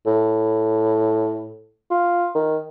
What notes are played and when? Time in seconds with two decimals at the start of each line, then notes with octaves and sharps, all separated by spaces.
0.07 A2
1.91 F4
2.35 D#3